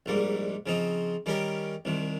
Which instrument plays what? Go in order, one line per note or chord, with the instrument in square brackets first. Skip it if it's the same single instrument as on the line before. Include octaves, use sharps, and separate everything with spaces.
[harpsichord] A#1 G#2 G3 A#3
C#3 F3 C4 D#4
D#3 G3 C#4 G4 A#4
C2 C3 D#3